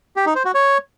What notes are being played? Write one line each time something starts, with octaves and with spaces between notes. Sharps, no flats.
G4
D#4
C5
F#4
C#5